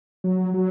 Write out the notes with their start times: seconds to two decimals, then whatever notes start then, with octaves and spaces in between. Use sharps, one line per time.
0.24 F#3
0.54 F#3